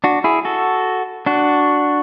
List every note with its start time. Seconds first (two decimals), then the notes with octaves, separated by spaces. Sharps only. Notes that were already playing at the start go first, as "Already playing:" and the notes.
0.04 D4 F#4
0.24 E4 G#4
0.45 F#4 A4
1.26 D4 F#4